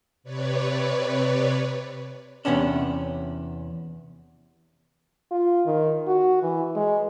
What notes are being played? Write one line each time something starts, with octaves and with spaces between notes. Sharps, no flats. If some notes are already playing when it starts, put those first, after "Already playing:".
C3 B4 C#5 D5
E2 G2 C3 B3 C#4 D4
F4
D#3
F#4
E3
G#3